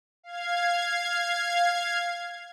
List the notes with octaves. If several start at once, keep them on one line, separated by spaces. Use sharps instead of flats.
F5 G#6